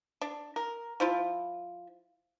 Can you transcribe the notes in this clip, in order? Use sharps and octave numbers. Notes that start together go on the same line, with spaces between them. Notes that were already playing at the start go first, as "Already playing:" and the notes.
D4
A#4
F3 E4 F4